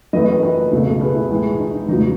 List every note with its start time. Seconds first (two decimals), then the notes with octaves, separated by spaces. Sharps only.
0.13 F#2 E3 A3 B4 D#5
0.28 B4 D#5
0.43 B4 D#5
0.72 C#2 B2 A3
0.90 A4
1.00 G#4 B4
1.15 E4 G#4
1.30 A2 E3 G#3
1.59 D#4
1.74 D#4
1.88 E2 C#3 F#3 D#4